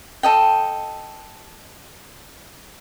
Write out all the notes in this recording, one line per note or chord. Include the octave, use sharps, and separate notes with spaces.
A4 D#5 G5